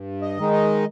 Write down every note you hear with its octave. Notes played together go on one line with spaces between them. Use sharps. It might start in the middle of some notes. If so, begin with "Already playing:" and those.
Already playing: G2
D#5
D#3 G#3 D#4
D#5